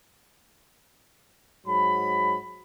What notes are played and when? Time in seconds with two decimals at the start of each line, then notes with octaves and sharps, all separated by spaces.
1.67 G#2 F#3 B5